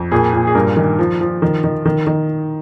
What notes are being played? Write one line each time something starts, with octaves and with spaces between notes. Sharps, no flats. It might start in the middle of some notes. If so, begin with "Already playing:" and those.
Already playing: F2
A#2 G#4
A#2
G#4
G2 A#4
D#3
F3
F3
D#3
D#3
D#3
D#3